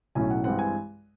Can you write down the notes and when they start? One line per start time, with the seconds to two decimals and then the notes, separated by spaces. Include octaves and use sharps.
0.15 B1 A2 F#3 A3 C#4 G#5
0.30 F#5
0.44 G2 E3 G#3 C4 F#5
0.59 G#5